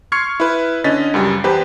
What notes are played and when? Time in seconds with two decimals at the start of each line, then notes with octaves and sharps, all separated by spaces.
0.12 C6 C#6 F6 G#6 C7 C#7
0.40 E4 B4
0.84 D3 C#4 D#5 A6 B6
1.14 C#2 F#2 G3
1.44 E2 G4 B4 C5